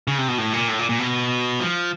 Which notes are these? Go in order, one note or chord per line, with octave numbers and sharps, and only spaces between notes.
C#3
C3
B2
A2
A#2
A2
A#2
A#2
B2
F3